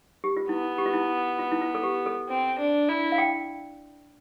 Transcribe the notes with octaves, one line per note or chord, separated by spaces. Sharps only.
G4
F4
B3 E4
G4
F4
E4
F4
E4
F4
A4
G4
A4
C4
D4
E4
F5
G5